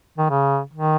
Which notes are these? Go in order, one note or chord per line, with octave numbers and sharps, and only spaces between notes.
D#3
C#3
D#3